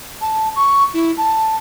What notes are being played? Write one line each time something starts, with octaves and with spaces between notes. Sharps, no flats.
A5
C#6
E4
A5